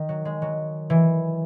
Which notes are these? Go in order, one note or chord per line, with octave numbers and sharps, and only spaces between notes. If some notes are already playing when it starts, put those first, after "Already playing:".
Already playing: D#3
F#3
G#3
F#3
E3